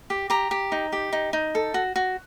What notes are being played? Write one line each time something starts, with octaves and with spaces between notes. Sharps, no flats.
G4
G4 A#5
G4
D#4
G4
D#4
D#4
A4
F#4
F#4